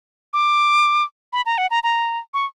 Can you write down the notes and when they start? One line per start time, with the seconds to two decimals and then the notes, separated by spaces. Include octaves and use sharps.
0.33 D6
1.33 B5
1.46 A#5
1.58 F#5
1.71 A#5
1.83 A#5
2.34 C#6